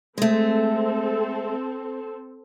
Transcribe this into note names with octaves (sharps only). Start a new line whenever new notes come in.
G#3 A3 C4 A4